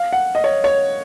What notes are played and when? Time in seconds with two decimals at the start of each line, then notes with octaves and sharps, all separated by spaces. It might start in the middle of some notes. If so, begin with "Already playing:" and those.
Already playing: F5
0.13 F#5
0.35 D#5
0.44 C#5
0.64 C#5